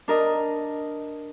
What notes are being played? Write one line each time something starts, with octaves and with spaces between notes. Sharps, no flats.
D4 A#4 D#5